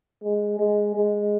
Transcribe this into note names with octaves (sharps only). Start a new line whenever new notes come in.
G#3
G#3
G#3